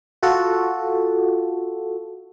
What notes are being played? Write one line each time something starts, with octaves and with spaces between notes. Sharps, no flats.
F4 F#4 A4